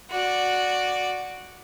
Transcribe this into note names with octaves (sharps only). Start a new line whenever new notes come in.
F#4 D5